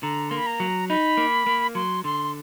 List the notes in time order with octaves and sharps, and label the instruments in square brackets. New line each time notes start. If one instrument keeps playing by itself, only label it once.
[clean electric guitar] D3 [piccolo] A#5
[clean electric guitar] A#3 [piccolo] C6
[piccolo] B5
A#5
[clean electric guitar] F#3
[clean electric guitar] D#4 [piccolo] B5
[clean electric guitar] A#3
A#3
[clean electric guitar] F#3 [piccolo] C6
[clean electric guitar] D3 [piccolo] C6